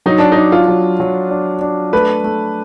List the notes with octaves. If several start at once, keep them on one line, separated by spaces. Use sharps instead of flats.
F#3 D#4
D4
D#4
D4
F4
F#3
F#3
D4
D4
A3 B4
A3